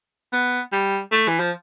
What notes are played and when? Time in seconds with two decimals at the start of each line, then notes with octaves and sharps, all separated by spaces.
0.32 B3
0.72 G3
1.11 A3
1.28 E3
1.39 F3